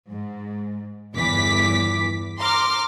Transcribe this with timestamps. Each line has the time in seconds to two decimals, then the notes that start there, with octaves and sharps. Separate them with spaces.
0.10 G#2
1.15 G1 E2 E3 D6 B6
2.39 A#5 C6 D6 F6